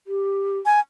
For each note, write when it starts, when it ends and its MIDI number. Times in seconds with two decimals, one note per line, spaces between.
0.07 0.58 67
0.66 0.80 80